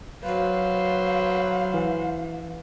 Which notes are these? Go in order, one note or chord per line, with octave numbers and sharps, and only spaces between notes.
F#3 B4 C5 F5
E3